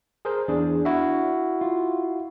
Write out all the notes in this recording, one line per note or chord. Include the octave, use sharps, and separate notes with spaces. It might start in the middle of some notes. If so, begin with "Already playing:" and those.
G#4 A#4 C5
E2 D4 G#4
E4 F#4 E5
F4